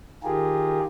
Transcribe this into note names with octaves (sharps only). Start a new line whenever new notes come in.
D#3 F4 G4 G#4 A#4